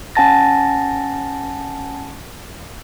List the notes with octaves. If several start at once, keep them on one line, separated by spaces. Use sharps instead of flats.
C#4 F#5 G#5 A5 A6 A#6